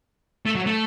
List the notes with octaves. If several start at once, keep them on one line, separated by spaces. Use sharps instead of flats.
A3
F#3
A3